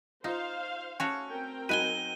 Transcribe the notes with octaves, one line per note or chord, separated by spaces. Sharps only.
D#4 F4 C5 F5
A3 C#4 F#4 C#5
C4 A#4 G5
F#3 D#4 F#4 B4 G#5 D#7 G7